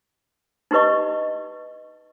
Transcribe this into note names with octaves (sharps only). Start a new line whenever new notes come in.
D#4 E4 G4 B4 D#5 C#6